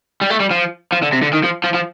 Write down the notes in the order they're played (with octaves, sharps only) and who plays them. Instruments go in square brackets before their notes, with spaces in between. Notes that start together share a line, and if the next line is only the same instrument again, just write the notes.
[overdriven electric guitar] G3
A3
G3
F3
F3
D3
C3
D3
D#3
F3
F3
F3